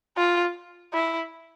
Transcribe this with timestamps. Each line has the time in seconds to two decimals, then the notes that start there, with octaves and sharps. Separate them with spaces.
0.17 F4
0.94 E4